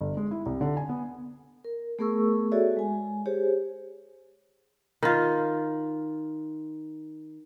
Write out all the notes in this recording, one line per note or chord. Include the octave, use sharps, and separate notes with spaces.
G1
G#3
E4
C2
D3
G#5
B3
A#4
A3 B3 G#4 A#4 C#6 E6
F#4 G#4 A4 C#5 D5 E5
G#3 G#5
G4 G#4 C5 C#5
D#3 F4